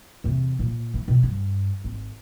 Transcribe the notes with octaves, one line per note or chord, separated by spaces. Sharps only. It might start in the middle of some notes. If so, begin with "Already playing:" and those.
E2 C3
A#2
E4
B2
G2
G#1